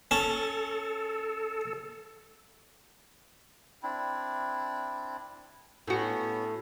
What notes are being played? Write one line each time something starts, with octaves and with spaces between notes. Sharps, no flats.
C#4 A4 A5
C4 D4 E4
A2 B3 C#4 F#4